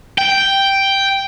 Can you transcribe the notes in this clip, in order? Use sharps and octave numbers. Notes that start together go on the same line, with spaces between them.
G5